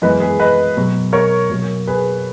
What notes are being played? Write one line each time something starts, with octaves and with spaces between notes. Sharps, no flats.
F#2 E3 G#3 B3 B4 D#5
G#4 B4
B4 D#5
B2 F#3 B3
A#4 C#5
B2 F#3 A#3
G#4 B4